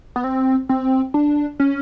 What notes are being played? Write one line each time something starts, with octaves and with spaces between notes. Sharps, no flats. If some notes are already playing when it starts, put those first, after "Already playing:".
B3
C4
C4
D4
C#4